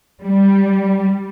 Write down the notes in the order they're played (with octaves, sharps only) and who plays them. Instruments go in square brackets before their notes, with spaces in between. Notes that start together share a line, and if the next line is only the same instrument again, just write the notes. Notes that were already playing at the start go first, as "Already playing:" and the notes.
[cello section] G3